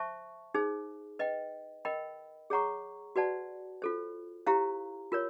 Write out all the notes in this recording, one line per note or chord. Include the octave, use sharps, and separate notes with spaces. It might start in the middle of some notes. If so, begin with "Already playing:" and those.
Already playing: C5 E5 A5 C#6
D#4 G#4 C5
B4 D#5 G5
A#4 D#5 G5 B5
G#4 C#5 F#5 A#5 C#6
F#4 B4 D5 F#5 A5
F4 A4 C5
E4 G4 C5 F5 A#5
F4 A#4 C#5